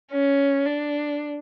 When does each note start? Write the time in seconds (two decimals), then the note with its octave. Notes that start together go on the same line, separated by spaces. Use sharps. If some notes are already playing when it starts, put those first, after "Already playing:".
0.12 C#4
0.66 D4